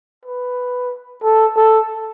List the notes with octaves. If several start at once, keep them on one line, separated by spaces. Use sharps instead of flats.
B4
A4
A4